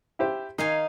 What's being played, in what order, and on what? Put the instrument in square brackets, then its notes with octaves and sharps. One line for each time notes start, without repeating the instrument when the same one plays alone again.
[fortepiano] E4 G4 C5
[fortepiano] D#3 [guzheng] D#4 F5 G#5